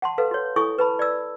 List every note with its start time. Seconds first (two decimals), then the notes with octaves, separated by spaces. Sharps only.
0.02 F#5 A5 C6
0.18 A4 B4 F5
0.31 F#4 C#5
0.56 E4 A4 G#5 C#6 D#6
0.79 B4 A5 B5
0.99 D5 E6